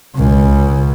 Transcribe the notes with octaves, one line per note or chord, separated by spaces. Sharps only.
C#2 C#3